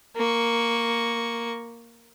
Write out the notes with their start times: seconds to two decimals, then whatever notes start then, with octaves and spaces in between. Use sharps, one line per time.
0.16 A#3 C#6